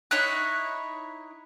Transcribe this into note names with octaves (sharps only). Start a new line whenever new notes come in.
D#4 E4 C#5 F#6